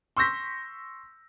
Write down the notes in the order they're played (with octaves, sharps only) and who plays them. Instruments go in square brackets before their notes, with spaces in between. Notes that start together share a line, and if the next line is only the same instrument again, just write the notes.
[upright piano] C6 C#6 E6 G6 A#6 B6